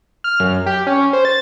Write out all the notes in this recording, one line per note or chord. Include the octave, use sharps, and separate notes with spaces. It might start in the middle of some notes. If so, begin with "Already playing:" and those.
F6
F#2
G4
C#4
C5
A6